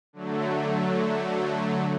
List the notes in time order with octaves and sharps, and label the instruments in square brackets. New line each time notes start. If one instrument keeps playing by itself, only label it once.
[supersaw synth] D3 F#3 A3